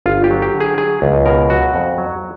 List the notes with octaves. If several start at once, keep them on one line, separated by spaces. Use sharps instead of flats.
G1 F4
G4
F#3
G4
D3
G#4
F#3 G#4
C#2
B2 A#4
F#3 F#4
F2
F#3